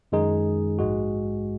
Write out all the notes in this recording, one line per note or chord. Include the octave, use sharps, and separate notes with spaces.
F#2 D#3 G#3 D#4 G#4
A#1 G#2 G#3 F#4